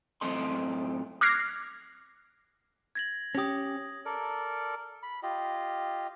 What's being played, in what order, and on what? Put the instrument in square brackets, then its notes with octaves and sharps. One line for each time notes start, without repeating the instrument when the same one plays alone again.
[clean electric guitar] F#2 A2 C4 A4 D#5 C6
[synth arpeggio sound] D6 F6 F#6 G#6 A#6 C7
[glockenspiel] G#6 A#6 F#7
[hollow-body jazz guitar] C#4 G4 [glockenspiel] D#6 A#6
[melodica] A4 A#4 D5
B5
F4 G4 D#5